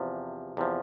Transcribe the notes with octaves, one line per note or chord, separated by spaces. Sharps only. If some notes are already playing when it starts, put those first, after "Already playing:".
Already playing: E2 C3 F3
E2 C3 F3